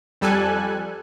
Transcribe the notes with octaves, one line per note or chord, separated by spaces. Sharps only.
F2 G3 A4 G#5 F#6